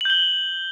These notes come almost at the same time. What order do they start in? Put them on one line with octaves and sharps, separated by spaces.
F#7 G6 G7